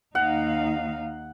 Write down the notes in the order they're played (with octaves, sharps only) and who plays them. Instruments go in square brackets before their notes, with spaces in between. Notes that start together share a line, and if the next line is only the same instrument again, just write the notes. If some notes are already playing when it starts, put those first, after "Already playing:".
[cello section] D#2 D#4 F5 [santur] F#5